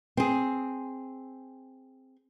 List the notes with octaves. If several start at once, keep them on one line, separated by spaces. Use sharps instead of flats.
C4 G#4